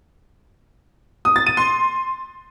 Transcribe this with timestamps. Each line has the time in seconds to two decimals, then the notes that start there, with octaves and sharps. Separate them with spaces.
1.25 D#6
1.36 A6
1.46 D#7
1.57 C6